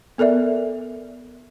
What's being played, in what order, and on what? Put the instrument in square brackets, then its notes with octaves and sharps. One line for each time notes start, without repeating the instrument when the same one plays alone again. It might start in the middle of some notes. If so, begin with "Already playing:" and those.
[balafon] B3 A4 A#4 D5 E5